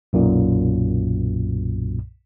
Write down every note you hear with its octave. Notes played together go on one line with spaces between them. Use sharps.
B1 F#2 A#2